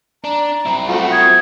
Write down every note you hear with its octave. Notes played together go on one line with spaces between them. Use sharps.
D4 A#5
C4 E4
F3 A3 F#4
D#6 G#6